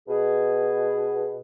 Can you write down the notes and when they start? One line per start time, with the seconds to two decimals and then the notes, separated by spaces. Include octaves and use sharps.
0.08 B2 G#4